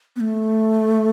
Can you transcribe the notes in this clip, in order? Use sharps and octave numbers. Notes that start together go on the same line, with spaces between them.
B3
A3